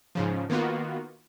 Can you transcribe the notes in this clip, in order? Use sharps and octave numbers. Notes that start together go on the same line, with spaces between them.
G#2 C#3 F3
D#3 A#3 B3 F4 F#4